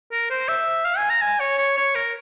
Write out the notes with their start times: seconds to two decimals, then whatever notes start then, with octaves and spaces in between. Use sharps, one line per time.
0.12 A#4
0.30 C5
0.48 E5
0.85 F5
0.97 G#5
1.10 A#5
1.22 G#5
1.40 C#5
1.58 C#5
1.77 C#5
1.95 A#4